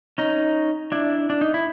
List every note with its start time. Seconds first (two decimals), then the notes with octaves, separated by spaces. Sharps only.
0.18 C#4 D#4
0.92 D4 E4
1.30 D4
1.41 D#4
1.54 E4